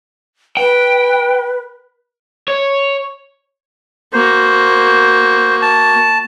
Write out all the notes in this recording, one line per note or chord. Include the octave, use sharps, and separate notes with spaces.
B4 G5
C#5
A#3 F#4 C5
A5